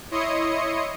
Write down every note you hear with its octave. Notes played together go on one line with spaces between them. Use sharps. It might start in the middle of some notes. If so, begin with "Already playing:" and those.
E4 C#5 D#5 C6 D#6 C#7